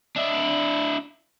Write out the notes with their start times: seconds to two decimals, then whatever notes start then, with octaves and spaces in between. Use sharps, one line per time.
0.16 D4 E4